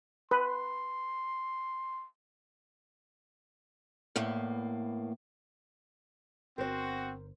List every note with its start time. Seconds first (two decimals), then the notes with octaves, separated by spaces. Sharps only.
0.31 B4 C6
4.16 E2 A2 A#3
6.58 G1 C4 F#4 A#4 C5